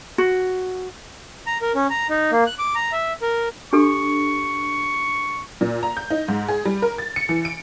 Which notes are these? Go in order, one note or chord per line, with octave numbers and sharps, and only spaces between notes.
F#4
A#5
A#4
C#4
A#5
D#4
A#3
F#6
D6
A#5
E5
A#4
D4 G4 A4 C#6
A#2
A#5
G6
D#4
G#2
G#4
G3
A#4
A6
C#7
E3
D7